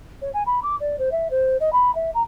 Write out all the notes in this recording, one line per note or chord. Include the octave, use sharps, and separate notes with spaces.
C#5
G#5
B5
D6
D5
C5
E5
C5
D#5
B5
E5
A#5